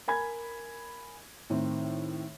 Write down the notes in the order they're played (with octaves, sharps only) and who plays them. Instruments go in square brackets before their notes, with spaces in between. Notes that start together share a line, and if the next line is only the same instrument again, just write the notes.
[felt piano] A#4 G#5 B5 G#6
A2 D#3 C4